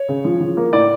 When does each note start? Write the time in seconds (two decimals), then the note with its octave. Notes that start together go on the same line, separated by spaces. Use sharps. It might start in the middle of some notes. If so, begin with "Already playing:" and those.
Already playing: C#5
0.09 C#3
0.25 F3
0.40 F3
0.57 A#3
0.73 A2 D5